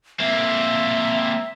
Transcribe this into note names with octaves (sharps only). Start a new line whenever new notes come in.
A#3 C4 E5